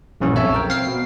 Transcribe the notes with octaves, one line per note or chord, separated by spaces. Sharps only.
A#1 G2 C#3 E3 B3 C#4
B1 F2 A4 C#5 E5 A5
A#4 G5
C4 F5 C7
B2